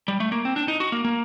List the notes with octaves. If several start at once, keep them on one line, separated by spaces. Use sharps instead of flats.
G3
A3
A#3
C4
D4
D#4
F#4
A#3
A#3